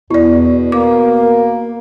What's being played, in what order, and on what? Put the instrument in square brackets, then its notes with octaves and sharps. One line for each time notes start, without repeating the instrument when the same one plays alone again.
[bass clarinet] E2 [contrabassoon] B2 [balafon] E4 D5
[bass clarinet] A#3 [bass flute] A#4 [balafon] D6